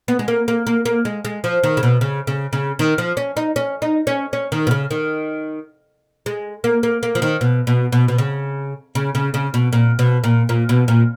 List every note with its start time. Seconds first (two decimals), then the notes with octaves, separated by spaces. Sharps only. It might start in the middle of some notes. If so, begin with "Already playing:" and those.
0.08 B3
0.19 G#3
0.28 A#3
0.48 A#3
0.67 A#3
0.85 A#3
1.05 G#3
1.25 G#3
1.44 F3
1.63 D#3
1.77 C#3
1.83 B2
2.01 C#3
2.27 C#3
2.53 C#3
2.79 D#3
2.98 F3
3.17 C#4
3.37 D#4
3.56 C#4
3.82 D#4
4.07 C#4
4.33 C#4
4.52 D#3
4.67 B2
4.71 C#3
4.91 D#3
6.26 G#3
6.64 A#3
6.83 A#3
7.03 A#3
7.15 F3
7.22 D#3
7.41 B2
7.67 B2
7.92 B2
8.08 B2
8.18 C#3
8.95 C#3
9.15 C#3
9.34 C#3
9.54 B2
9.73 A#2
9.99 B2
10.24 A#2
10.49 A#2
10.69 B2
10.88 A#2